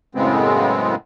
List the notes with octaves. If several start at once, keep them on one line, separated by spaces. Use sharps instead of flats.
F#2 A2 C#3 G#3 B3 C4